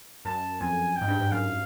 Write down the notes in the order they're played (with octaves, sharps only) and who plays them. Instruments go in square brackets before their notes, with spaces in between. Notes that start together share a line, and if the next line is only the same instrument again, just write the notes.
[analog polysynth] F#2 [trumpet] A5
[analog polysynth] F2 [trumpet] G#5
[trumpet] G5
[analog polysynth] G#2
G2
G#2
[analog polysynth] F#2 [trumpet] F5